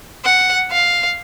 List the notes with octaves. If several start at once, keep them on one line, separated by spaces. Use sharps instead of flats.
F#5
F5